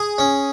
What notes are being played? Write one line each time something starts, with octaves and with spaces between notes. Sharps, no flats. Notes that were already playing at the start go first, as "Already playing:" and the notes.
Already playing: G#4
C#4